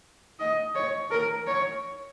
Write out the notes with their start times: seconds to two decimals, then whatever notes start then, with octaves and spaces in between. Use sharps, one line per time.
0.39 D#5
0.75 C#5
1.10 A#4
1.47 C#5